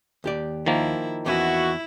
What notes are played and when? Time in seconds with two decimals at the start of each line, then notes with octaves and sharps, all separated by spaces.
0.24 D#2 G4 D5
0.66 D#3 F3 A#3 E4
1.26 E2 C#4 E4 F#4